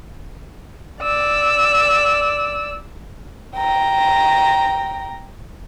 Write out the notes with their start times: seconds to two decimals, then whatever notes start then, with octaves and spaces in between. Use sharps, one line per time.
1.02 D5 E6
3.56 G5 A#5